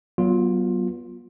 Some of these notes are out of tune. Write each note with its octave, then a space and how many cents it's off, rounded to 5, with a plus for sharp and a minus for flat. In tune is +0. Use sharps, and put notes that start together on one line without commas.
F#3 +30 B3 -25 F4 +10